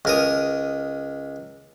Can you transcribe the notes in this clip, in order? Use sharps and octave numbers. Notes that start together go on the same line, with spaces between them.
C#2 A#4 D#6